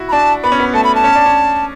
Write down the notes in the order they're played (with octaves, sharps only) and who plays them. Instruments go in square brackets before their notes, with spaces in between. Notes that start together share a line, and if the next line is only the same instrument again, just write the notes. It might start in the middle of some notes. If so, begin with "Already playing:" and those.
Already playing: [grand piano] E4 F#4
[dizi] B5
[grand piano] D4 [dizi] A5
[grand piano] B3 [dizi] B5
[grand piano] C#4
B3
[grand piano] A3 [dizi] A5
[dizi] B5
A5
[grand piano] C#4
D4
C#4